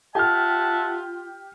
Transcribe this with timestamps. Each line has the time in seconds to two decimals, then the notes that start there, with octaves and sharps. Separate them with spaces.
0.15 F4 G4 E5 F#5 A5 F6